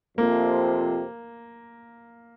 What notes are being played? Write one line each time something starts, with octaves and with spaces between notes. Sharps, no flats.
F2 C3 F3 A#3